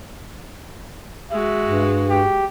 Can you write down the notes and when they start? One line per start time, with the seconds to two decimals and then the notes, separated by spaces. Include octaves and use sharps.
1.31 G#3 F#4 E5
1.64 G2
2.10 G4